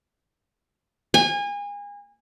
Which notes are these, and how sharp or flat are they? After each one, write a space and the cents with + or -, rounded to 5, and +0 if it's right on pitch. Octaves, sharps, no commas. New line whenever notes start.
G#5 -30